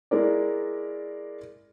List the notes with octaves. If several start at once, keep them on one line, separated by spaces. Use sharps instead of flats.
G#3 E4 A#4 D5